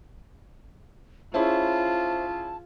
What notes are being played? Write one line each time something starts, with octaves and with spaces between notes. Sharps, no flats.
C#4 E4 F4 G#4 C5 E5 A5